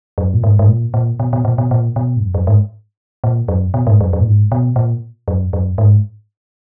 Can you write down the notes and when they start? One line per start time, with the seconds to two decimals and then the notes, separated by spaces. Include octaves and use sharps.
0.18 F#2
0.34 A#2
0.44 G#2
0.59 G#2
0.68 A#2
0.94 A#2
1.20 B2
1.33 B2
1.45 A#2
1.58 B2
1.71 A#2
1.96 B2
2.16 G#2
2.21 F#2
2.34 F#2
2.47 G#2
3.24 A#2
3.48 F#2
3.74 B2
3.87 G#2
4.01 F#2
4.13 F#2
4.20 A#2
4.26 G#2
4.52 B2
4.76 A#2
5.28 F#2
5.53 F#2
5.78 G#2